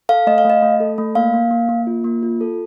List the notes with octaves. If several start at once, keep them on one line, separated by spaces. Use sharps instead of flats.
A4 F5
A3 D#5
F5
A3
D#5
A3
A4
A3
A#3 F5
A#3
A#3
A#3
F4
A#3
F4
A4